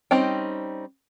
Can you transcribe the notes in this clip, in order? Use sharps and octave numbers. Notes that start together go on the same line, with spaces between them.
G3 C4 C#4 D#4 G5